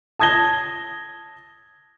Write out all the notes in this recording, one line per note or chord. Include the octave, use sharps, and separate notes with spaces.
A5 D#6 G#6 A#6 G7